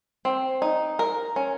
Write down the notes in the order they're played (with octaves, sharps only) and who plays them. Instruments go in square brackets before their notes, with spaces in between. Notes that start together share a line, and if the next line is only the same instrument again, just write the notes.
[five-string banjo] C4
D#4
A#4
C#4